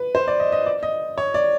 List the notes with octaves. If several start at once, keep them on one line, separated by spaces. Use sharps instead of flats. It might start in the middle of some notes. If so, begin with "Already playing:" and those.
Already playing: B4
C5
D5
D#5
D#5
D5
D#5
C#5
D5